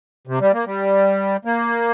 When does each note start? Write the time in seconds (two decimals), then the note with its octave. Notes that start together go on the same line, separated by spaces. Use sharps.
0.27 C3
0.40 G3
0.53 A#3
0.66 G3
1.45 A#3